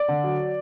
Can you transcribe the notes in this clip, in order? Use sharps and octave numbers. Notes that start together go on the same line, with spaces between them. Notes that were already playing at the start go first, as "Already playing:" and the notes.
Already playing: D5
D3
F#3